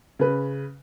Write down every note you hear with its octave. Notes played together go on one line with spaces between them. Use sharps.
C#3 B4